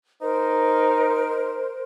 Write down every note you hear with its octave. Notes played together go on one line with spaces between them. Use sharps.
D#4 A#4 C5